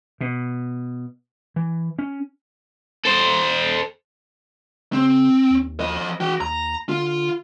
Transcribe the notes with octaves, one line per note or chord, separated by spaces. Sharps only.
B2
E3
C#4
A4 C5
C#3 C4
D#2
F3 D#5
E3 F#4 G5
D#2 A#5
D3 F4